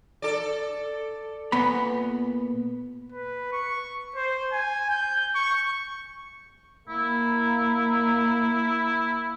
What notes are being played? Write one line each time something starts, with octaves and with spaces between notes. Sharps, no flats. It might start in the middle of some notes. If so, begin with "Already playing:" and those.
A4 D5
A#2 B3 B5
B4
C#6
C5
G#5
G6
C#6
A#3 E4